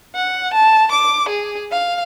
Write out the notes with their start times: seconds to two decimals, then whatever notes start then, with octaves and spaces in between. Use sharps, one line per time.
0.15 F#5
0.54 A5
0.91 D6
1.29 G#4
1.72 F5